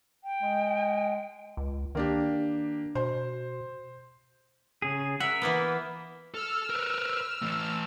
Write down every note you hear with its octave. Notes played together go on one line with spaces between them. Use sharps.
G5
G#3
C#2
D#3 A#3 D4 G4
B2 C5
C#3 G#4
A#4 E5 F#5
E3 A#3 B3
A4 E6 F6
A#4 B4
E3 A3